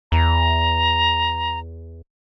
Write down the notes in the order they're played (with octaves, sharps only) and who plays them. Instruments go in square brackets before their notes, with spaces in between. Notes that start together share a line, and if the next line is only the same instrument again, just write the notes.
[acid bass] E2 [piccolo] A#5